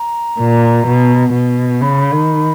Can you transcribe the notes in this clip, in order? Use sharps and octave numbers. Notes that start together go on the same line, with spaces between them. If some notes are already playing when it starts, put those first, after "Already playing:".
Already playing: A#5
A#2
B2
B2
C#3 B5
D#3